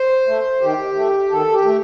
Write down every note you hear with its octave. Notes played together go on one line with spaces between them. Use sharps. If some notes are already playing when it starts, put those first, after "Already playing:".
Already playing: C5
A3
D#3 G4
A3
D#3 A4
G4
A3